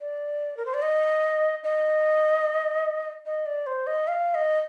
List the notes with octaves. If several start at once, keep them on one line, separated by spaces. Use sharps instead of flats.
D5
A#4
C5
D5
D#5
D#5
D#5
D5
C5
D#5
F5
D#5